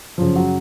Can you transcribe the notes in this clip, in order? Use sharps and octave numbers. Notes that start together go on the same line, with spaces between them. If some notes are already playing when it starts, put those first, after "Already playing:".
F#2 C#3 F3
F#3